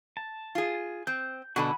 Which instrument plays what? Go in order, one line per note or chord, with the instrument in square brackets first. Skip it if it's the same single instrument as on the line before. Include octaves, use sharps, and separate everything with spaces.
[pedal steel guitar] A5
[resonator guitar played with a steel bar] F4 G#4
[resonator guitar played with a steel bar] C4 [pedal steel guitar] G6
[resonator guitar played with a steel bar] B2 D3 A4 [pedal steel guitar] F#4 G#5 B5